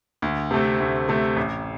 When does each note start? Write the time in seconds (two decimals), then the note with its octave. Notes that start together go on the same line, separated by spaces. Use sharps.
0.22 D2
0.51 C3 A3 C4
0.80 D2
1.09 C3 A3 C4
1.37 A1